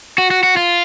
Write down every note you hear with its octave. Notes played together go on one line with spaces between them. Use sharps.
F#4
F#4
F#4
F4